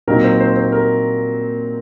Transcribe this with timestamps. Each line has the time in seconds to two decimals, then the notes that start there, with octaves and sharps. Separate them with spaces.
0.07 A#2 F#3 C4 D#4 A#4
0.24 C5
0.40 C5
0.56 C5
0.72 A#4